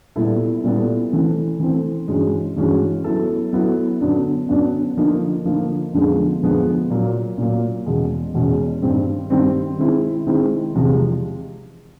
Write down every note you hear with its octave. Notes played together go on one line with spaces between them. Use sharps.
A#2 G3 B3 E4 A4
A#2 G3 B3 E4 A4
E3 A3 C4
E3 A3 C4
G2 E3 G#3 C#4 F#4
G2 E3 G#3 C#4 F#4
F#3 B3 E4 A4
F#3 B3 E4 A4
F#2 D3 F#3 B3 D4
F#2 D3 F#3 B3 D4
D3 F3 A#3 D#4
D3 F3 A#3 D#4
F2 D3 F3 G#3 B3
F2 D3 F3 G#3 B3
A#2 F#3 A#3
A#2 F#3 A#3
E2 B2 G#3 C#4
E2 B2 G#3 C#4
G2 D#3 G3 C4
G2 D#3 G3 C4
D#3 G#3 C4 E4
D#3 G#3 C4 E4
E2 C3 F3 G#3